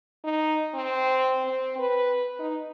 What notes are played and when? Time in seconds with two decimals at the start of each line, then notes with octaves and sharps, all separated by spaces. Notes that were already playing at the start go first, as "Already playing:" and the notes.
0.24 D#4
0.74 C4
1.45 C4
1.79 B4
2.39 D#4